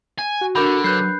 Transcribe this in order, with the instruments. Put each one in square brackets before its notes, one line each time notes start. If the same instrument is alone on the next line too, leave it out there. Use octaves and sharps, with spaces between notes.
[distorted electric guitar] G#5
[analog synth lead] F#4
[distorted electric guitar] D3 [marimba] D4 A#4 G6 [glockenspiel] B5
[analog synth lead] F#3 [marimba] B4 B5 [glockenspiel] F#6 G6 C7